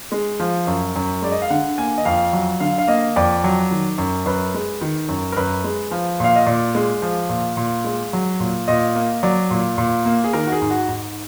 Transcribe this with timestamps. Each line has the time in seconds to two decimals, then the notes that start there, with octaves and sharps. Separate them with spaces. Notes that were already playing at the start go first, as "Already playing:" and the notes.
0.12 G#3
0.40 F3
0.67 F#2
0.96 F#2
1.22 G#3 D5
1.32 D#5
1.42 F5
1.50 D3 F#5
1.78 A#3 G#5
1.98 D#5
2.05 F2 F5
2.33 F#3
2.60 D3 F5
2.78 F5
2.88 A#3 D#5
3.16 F2 D5
3.44 F#3
3.71 D#3
3.98 F#2
4.26 F#2 B4
4.54 G#3
4.81 D#3
5.09 F#2
5.32 A#4
5.36 F#2 B4
5.64 G#3
5.91 F3
6.20 A#2 F5
6.36 D#5
6.46 A#2 D5
6.75 G#3
7.02 F3
7.29 A#2
7.57 A#2
7.84 G#3
8.13 F#3
8.40 A#2
8.68 A#2 D#5
8.96 A#3
9.23 F#3 D5
9.51 A#2
9.78 A#2
10.05 A#3
10.24 G#4
10.33 D#3 A#4
10.47 F#4
10.52 G#4
10.62 G#2
10.70 F#4
10.88 G#2